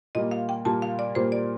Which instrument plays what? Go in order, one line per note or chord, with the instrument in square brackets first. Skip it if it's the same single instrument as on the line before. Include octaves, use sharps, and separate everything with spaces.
[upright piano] A#2 G3 A#3 [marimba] D#5
[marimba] F5
G5
[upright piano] A#2 G3 A#3 [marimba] A5
[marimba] F5
D5
[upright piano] A#2 G3 A#3 [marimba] C5
[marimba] D5